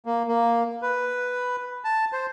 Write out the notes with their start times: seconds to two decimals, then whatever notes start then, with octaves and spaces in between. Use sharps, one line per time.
0.06 A#3
0.28 A#3
0.82 B4
1.85 A5
2.13 C5